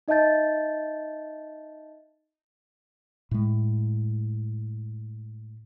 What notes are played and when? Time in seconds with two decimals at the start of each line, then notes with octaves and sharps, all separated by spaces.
0.08 D#4 D#5 E5 A5 G6 A6
3.31 A2 G#3